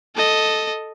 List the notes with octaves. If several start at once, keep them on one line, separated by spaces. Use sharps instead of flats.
A4 D#5